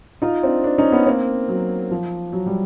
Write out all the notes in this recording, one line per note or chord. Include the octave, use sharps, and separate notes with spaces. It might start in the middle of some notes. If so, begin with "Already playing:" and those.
D#4 F4
C4 D4
C4 D4
C#4 D#4
B3 C#4
A#3 C4
F#3
F3
F#3
G3